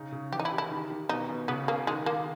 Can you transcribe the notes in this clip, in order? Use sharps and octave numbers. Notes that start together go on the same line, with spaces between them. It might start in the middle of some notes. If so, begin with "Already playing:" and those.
Already playing: C#3 D#4
C#3
E3 G4
D#4
E4
G4
E4
D#3
D#3
B2 D#4
B2
C#3 B3
A#3 G#4
D#3 G#3
D#3 A#3